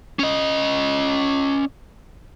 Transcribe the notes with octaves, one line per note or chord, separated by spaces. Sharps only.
C#4 D#5